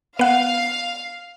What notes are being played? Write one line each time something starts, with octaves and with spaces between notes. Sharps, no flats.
B3 F5 F#5